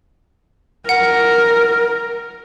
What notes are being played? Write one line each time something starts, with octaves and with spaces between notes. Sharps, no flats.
A#4 F#5